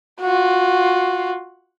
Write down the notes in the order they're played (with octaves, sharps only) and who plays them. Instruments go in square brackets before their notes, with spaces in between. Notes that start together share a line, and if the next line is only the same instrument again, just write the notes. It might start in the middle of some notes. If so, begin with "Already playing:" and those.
[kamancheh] F4 F#4